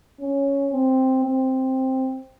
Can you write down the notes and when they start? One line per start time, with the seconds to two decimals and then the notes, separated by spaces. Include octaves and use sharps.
0.21 C#4
0.73 C4
1.24 C4